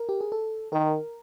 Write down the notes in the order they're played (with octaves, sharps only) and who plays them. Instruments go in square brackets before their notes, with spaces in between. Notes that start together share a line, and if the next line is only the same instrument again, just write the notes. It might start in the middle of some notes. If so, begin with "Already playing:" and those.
Already playing: [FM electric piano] A#4
G4
G#4
A4
[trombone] D#3 [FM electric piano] A#4